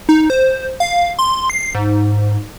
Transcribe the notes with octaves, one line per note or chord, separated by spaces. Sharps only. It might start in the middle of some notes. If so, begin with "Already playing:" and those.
D#4
C5
F5
C6
C7
G#2